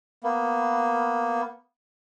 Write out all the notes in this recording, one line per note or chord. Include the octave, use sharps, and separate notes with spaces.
A#3 B3